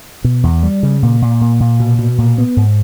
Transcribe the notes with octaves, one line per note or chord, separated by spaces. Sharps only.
B2
E2
G3
C#3
A#2
A#2
A#2
A#2
B2
B2
A#2
B3
G#2